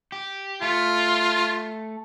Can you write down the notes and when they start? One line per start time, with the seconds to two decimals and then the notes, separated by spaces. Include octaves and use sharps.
0.12 G4
0.62 A3 F4